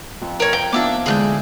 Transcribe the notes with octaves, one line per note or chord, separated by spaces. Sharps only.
F2
A#4 C#5 A#5
G5
B3 D4 D#4 F4 E5 D6
D3 E3 G#3 G#4 F#6 G6